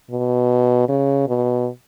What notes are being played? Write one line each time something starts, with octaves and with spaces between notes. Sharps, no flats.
B2
C#3
B2